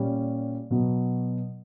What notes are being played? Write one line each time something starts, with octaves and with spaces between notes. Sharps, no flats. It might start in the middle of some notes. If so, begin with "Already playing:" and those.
Already playing: A#2 G3 C#4 G4
B2 F#3 B3